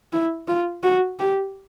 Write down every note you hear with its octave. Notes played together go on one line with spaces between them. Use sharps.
E4
F4
F#4
G4